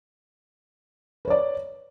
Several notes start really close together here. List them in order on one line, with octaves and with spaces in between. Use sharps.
B4 C#5 D5